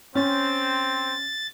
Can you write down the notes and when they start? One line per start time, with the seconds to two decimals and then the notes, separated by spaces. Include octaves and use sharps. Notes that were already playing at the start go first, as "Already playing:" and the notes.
0.15 C4 C#4 A6